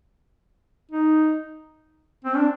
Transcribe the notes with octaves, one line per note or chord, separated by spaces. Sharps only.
D#4
C4
D4